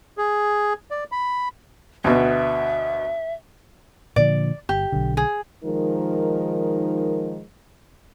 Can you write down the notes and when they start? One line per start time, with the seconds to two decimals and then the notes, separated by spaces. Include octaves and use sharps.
0.18 G#4
0.91 D5
1.12 B5
2.04 D2 B2 E5
4.16 A#2 D3 F3 D5
4.69 G1 G4
4.92 B1 D3
5.17 G#4
5.64 D#3 F3 G#3 D#4 A#4